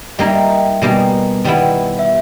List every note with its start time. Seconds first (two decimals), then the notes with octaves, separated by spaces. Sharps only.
0.19 G3 A#3 D#4 D#5
0.26 E5
0.34 D#5
0.42 E5
0.50 G5
0.82 B2 G3 A#3 D#4 G#5
1.44 D#3 G3 B3 E4
1.99 E5